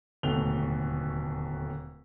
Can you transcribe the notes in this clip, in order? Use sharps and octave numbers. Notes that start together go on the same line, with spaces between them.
D1 D#2 B2 A3 F7 G7